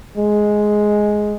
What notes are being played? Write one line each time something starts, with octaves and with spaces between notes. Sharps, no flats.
G#3